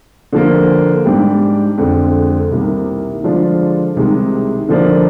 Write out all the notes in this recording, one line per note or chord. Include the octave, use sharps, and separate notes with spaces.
D3 F3 A#3
G#2 G3 D4 G4
F2 D3 G#3
C2 C3 D#3 A#3
D3 F3 G#3 D4 F4
C2 C3 D#3 G#3
D3 F3 A#3 D4